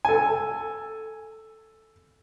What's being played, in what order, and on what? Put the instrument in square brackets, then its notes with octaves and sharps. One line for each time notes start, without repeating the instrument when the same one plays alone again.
[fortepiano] A4 G#5